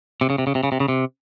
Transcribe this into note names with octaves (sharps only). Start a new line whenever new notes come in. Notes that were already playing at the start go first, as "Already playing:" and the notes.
C3
C#3
C3
C#3
C3
C#3
C3
C#3
C3